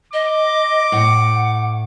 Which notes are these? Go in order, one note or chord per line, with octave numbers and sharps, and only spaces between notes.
D#5 D6
A2 F#5